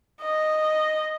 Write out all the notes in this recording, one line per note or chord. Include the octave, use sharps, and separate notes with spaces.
D#5